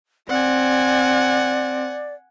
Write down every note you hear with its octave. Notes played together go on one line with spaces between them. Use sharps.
C4 D5 F#5 G#5